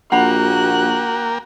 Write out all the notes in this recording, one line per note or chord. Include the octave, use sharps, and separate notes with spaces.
A#1 A#3 F#4 A#4 F#5 G5 B5 F#6